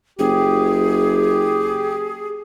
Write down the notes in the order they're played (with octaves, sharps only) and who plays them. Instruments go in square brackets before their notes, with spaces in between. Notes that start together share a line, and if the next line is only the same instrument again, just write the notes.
[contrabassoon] F#1 [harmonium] G4 [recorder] G#4